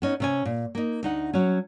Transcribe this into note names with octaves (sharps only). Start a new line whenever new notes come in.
B3 C#4 D#4
C3 C#4 G#5
A#2
A#3 D#4
D2 D#4 F#5
F#3 C#4